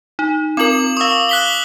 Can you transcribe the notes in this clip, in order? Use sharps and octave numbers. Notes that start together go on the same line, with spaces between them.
D#4
C4 F4 A#4 D6 F#7
F5 C#6 D#6 E6
F#6 B6 G7